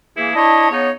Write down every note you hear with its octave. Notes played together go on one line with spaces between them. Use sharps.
E3 A#3 E4 G#4
D4 E4 C#5 D#5 A5
C#3 B3 D#4 C#5